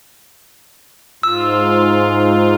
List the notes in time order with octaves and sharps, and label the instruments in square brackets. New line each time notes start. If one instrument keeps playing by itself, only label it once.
[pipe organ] G#2 F4 [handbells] E6